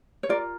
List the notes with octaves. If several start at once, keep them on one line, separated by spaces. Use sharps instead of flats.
C#5
F4 A#4 D5